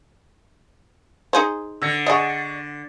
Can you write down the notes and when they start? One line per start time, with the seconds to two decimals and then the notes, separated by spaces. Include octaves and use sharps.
1.33 D#4 G#4 C5
1.82 D3 E6 A#6 C#7
2.06 G#4 D5 D#5 F#5 C#6